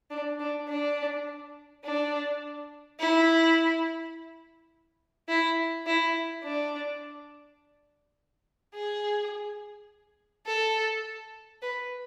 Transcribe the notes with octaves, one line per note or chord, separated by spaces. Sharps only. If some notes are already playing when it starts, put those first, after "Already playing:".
D4
D4
D4
D4
E4
E4
E4
D4
G#4
A4
B4